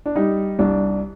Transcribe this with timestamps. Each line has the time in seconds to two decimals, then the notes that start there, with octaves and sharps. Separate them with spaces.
0.06 D4
0.16 G3 D#4
0.59 C2 D4